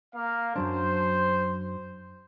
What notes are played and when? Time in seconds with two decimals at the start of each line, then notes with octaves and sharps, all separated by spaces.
0.15 A#3 F5
0.56 F#2 F#3 D4 C5